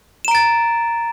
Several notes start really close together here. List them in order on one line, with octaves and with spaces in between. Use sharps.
E7 A#5 D7 A6